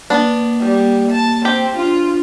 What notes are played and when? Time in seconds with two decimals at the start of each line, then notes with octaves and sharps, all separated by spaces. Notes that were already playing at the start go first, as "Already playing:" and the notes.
0.10 A#3 B3 D4
0.59 G3
1.11 A5
1.45 C4 G4
1.76 D4 F4